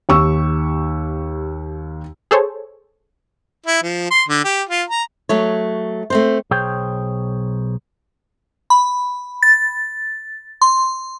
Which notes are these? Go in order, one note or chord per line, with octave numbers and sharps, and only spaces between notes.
D#2 G4 C#6 E6
G#4 A4 C5 C#5
E4
F3
C6
D3
G4
F4
A#5
F#3 A3 C#5
A3 C4 C5
B1 G#4 C5 C#5 G5
B5
A6
C6